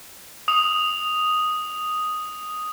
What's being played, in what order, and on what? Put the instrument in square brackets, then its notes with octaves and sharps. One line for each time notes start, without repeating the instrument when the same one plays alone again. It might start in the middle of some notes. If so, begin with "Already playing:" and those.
[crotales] D#6 F7